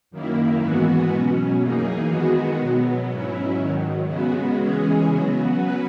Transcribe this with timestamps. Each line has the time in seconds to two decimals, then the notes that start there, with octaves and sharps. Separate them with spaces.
0.11 F#2 D#3 A#3 E4
0.60 G#2 E3 G#3 B3 F#4
1.09 B2 F#3 C#4
1.60 F#2 E3 A#3 D#4 G#4
2.08 D#3 G#3 B3 F#4
2.58 B2 F#3 B3
3.08 G#2 F#3 C#4 E4
3.57 G#2 D#3 F#3
4.06 C#3 G#3 B3 F#4
4.57 E3 G#3 C#4 G#4
5.06 C#3 F#3 B3 F#4
5.56 F#3 C#4 F#4 B4